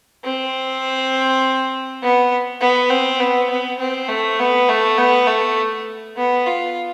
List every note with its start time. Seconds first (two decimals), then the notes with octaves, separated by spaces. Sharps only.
0.24 C4
2.03 B3
2.61 B3
2.90 C4
3.20 B3
3.50 B3
3.80 C4
4.09 A3
4.39 B3
4.69 A3
4.98 B3
5.27 A3
6.17 B3
6.47 F4